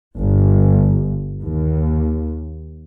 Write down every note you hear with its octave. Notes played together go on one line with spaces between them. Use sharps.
G1
D#2